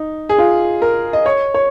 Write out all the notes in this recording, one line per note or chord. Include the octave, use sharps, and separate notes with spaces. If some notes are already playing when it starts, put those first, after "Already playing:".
Already playing: D#4
G#4
F4
A#4
D#5
C#5
C#5